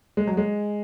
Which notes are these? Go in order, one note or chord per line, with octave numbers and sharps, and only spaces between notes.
G#3
F#3
G#3